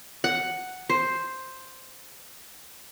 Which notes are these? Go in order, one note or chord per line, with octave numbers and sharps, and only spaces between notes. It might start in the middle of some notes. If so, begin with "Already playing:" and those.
F#5
C5